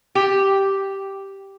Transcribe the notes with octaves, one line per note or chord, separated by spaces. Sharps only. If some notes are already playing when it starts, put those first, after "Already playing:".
G4